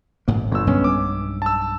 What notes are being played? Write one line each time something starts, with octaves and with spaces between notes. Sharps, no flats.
A1 G#2 A#3
G1 A#2 E6
B1 G2 G#3 B3 C#4
D6
A5 E6